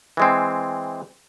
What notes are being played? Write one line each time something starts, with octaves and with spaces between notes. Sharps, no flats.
E3 G#3 C4